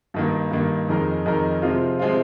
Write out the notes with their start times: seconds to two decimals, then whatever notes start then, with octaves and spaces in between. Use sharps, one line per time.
0.14 G2 D#3 A#3
0.51 G2 D#3 A#3
0.89 F2 D#3 G#3 D#4 A#4
1.26 F2 D#3 G#3 D#4 A#4
1.62 C3 F3 G#3 C4 F4
1.99 C3 F3 G#3 C4 F4